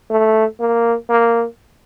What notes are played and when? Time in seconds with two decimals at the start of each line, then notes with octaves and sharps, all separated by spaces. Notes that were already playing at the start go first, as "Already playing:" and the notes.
0.10 A3
0.60 A#3
1.10 A#3